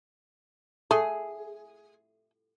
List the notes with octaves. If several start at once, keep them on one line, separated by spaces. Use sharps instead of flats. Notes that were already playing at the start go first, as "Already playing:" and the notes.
A3 G#4